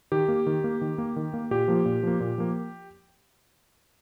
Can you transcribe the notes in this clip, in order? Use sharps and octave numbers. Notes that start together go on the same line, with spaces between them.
D#3 G4
A#3
D#3
A#3
D#3
A#3
D#3
A#3
A#2 G4
F3 A#3
A#2
F3 A#3
A#2
F3 A#3